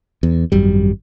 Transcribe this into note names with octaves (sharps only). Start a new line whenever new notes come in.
E2
G#1 F#2 G3